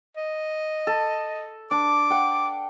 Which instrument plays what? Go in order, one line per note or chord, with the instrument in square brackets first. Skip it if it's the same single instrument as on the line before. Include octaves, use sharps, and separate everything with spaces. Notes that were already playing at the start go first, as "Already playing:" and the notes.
[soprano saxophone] D#5
[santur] A4
[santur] D4 [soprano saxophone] D6
[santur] F#5 G5